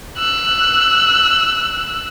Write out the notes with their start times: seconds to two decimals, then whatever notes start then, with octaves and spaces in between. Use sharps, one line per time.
0.18 E6 F#6